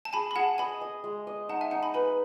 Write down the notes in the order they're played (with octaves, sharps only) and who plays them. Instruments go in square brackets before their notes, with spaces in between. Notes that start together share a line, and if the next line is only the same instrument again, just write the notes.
[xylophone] A5
[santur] G#4 [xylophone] G#5 B5
[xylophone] B5
[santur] G#4 [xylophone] F#5 A5
[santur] D#5 [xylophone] G#5 B5
[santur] D#5
G#3
D#5
[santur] D#4 [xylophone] F#5 A5
[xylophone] E5 G#5
[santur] D#4 [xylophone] F#5 A5
[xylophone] G#5 B5
[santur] B4 [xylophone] G#5 B5